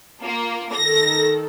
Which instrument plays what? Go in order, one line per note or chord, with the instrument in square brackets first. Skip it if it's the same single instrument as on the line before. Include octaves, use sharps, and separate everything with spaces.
[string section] A#3 [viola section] F4
[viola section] D#3 A4 [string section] A#6